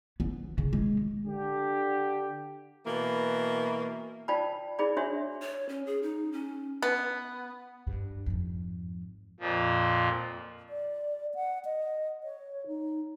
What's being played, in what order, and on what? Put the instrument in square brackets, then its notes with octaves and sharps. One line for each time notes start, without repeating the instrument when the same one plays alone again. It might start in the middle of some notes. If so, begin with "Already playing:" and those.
[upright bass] B3
C#3
G#3
[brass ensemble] D3 G4
[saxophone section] B2 E3 A#3
[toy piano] F4 D5 G5 A5 B5
E4 G#4 D5 B5
D4 F#4 C#5 E5 C6
[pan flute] C#5
C#4
G#4
D#4
C#4
[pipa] B3
[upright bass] G2
F2 G#2
[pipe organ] F2 A#2 F3
[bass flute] D5
F#5
D#5
C#5
D#4